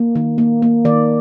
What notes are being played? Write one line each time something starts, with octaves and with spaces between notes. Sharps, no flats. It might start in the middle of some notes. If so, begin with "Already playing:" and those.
Already playing: A#3
D#3
A#3
A#3
D#3 D5